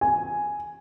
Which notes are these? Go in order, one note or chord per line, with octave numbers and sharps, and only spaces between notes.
G#5